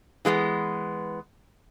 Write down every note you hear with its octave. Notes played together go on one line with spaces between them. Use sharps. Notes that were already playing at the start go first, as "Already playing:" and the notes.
E3 G#3 A#3 B3